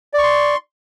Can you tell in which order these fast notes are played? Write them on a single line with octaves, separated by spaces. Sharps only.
D5 C#6 C6